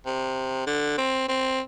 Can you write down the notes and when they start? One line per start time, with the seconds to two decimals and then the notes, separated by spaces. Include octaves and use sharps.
0.06 C3
0.67 D3
0.98 C4
1.28 C4